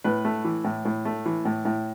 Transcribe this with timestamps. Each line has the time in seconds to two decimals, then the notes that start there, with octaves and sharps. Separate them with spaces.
0.04 A2 B4
0.25 A3
0.45 E3
0.65 A2
0.85 A2
1.05 A3
1.26 E3
1.45 A2
1.65 A2